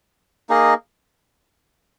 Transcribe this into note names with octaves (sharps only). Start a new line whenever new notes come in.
A#3 D#4 G#4 D#5